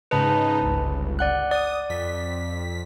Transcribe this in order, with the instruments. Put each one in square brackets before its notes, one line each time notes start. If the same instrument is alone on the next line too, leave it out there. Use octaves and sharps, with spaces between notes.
[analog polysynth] G#2 C#3 D#4 [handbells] B4 A5 B5
[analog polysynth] G1 C#2
[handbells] D5 F#5 F#6
[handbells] D5 [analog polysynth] D#6
[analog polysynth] F2 B6